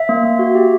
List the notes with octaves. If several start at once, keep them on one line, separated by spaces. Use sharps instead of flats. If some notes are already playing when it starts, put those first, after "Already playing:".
Already playing: E5
A#3
A#3
F#4
G4